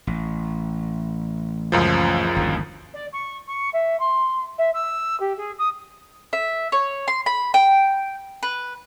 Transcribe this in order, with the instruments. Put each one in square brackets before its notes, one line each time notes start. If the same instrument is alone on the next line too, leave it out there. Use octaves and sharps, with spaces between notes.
[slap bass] A1
[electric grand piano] C#2 F#2 F3
[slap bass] G1 D#2 D3
[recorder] D5
C#6
C#6
E5
C6
E5
E6
G4
G#4
D#6
[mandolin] E5
C#5
C6
B5
G5
B4